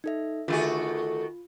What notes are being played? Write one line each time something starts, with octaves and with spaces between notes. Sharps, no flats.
D#4 A4 E5
D3 D#3 A3 F4 F#4 G#4